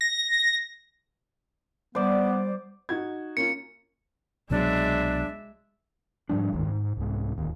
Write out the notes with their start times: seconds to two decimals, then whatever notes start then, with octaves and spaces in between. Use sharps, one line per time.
0.01 A#6
1.95 G3 B3 C5 D5
2.89 D#4 F#4 G#6
3.37 A#3 C#4 F4 C#7
4.50 C2 B2 F#3 G#3 D4 E5
6.29 G#2 F3 G3 D4
6.53 D1 G1 G#2 D#3
6.68 G#2
6.97 C2 G#2
7.38 D1 D#2